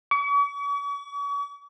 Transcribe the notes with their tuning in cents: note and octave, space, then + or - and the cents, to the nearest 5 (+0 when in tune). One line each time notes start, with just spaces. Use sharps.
C#6 +45